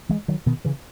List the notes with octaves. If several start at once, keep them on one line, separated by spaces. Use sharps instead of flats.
E3 G#3
D#3 F#3
B2 D#3
C#3 E3